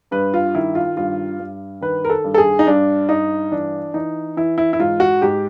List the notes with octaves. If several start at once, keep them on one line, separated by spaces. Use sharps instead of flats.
G2 B4
F4
D#3 E4
F4
G2 F4
G2
D#3 B4
A#4
A4
G2
A4
G#4
D#4
G2 D4
G2 D#4
E3 D4
E3 D#4
E3 E4
E4
E4
G#2 F4
F#4
G#2 G4